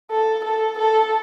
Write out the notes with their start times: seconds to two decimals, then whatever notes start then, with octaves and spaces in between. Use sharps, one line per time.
0.11 A4
0.44 A4
0.79 A4